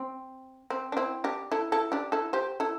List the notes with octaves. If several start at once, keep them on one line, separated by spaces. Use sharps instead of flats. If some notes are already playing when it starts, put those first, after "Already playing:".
Already playing: C4
C4
D4
C4 E4
D4 G4
E4 A4
E4 A4
D4 G4
E4 A4
G4 C5
E4 A4